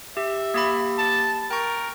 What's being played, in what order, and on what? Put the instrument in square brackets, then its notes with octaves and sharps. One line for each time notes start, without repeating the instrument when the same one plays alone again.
[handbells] G4 [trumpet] E5
[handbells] A#3 G4 B5
[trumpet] A5
[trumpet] A#4 [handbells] G5 C#6